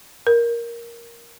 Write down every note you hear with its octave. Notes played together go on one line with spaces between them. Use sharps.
A#4